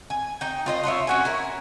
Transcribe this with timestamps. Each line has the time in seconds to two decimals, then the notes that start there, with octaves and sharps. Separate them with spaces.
0.10 G#5
0.41 D#4 G5
0.66 F4 C5 D#5
0.84 D4 F4 C#5 E5
1.07 C#4 F#4 G#5
1.25 E4 A#4